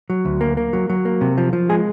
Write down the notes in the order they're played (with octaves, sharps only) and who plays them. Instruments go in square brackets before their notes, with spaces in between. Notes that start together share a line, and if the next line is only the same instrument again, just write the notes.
[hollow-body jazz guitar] F#3
D2
A#3
A#3
F#3
F#3
A#3
C3
F3
F3
G#3 G#4